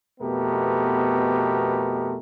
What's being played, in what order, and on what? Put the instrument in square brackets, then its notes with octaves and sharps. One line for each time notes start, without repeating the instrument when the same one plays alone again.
[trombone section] F2 B2 A3 B3 G4 A#4